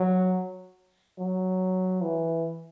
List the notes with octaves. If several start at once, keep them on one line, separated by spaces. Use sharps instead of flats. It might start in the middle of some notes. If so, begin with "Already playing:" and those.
Already playing: F#3
F#3
E3